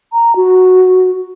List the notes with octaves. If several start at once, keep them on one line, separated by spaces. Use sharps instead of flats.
A#5
F#4